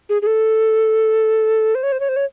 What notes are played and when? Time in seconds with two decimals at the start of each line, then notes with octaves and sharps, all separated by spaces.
0.09 G#4
0.22 G#4
0.27 A4
1.75 C5
1.83 C#5
1.92 C5
2.00 C#5
2.09 C5
2.16 C#5